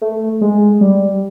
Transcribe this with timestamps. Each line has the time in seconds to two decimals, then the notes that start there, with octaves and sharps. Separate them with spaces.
0.01 A3
0.41 G#3
0.81 G3